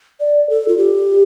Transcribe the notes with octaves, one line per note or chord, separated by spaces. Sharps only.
D5
A4
F4
G4